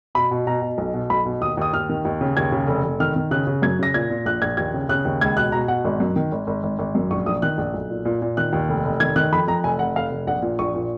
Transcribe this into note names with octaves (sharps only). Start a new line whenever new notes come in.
B2 B5
B2
B2 A#5
B2
B1
B2
B1 B5
B2
D#2 D#6
D#2 D#6
D#2 F6
D#3
D#2
C#3
D#2 G#6
C#3
F1
F1
D#3 F6
D#3
C#3 F#6
C#3
F#2 G#6
C#3 A#6
A#2 G#6
A#2
A#1 F#6
A#1 G#6
D#2 G#6
C#3
C#3 F#6
D#2
C#2 G#6
B2 F#6
B2 A#5
B2 F#5
G#1
F#2
D#3
G#1
G#1
G#1
G#1
F#2
A#1 C#6
A#1 D#6
D#3 F#6
A#1
B1
A#2
A#2
A#2
D#3 F#6
D#2
F1
F1
D#3 G#6
D#3 F#6
F2 B5
F2 A#5
F1 G#5
F1 F#5
F1 F5
F1
A#1 F#5
A#2
A#1 C#6
A#2